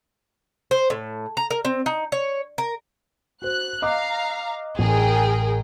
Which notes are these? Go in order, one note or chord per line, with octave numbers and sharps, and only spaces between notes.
C5
A2
A#5
A#4
C4
D#4
C#5
A#4
F#4 C5 F#6
D#5 F5 A#5 D6 F#6
A1 G#4 A#4 G5